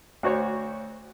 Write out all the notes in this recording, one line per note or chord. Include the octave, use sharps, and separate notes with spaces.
D2 F#4 C5 C#5